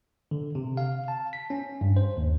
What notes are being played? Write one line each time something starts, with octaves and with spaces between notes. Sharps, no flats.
D3
C3
F5
A5
B6
C#4
G2
C5
D#2